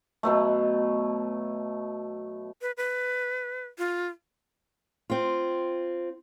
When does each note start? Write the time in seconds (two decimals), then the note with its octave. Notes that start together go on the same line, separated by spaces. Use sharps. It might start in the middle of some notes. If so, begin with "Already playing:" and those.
0.23 B2 F#3 A3
2.61 B4
2.77 B4
3.78 F4
5.10 C4 F4